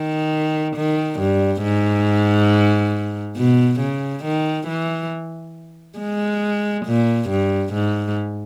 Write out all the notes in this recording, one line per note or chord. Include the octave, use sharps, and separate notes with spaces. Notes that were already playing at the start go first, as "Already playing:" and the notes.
Already playing: D#3
D#3
G2
G#2
B2
C#3
D#3
E3
G#3
A#2
G2
G#2